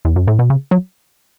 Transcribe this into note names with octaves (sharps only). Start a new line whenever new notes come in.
E2
F#2
A2
B2
C#3
F#3